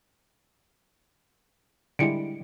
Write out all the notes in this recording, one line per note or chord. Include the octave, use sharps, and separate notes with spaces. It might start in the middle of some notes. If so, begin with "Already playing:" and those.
D3 G3 G#3 E4 C#7 D7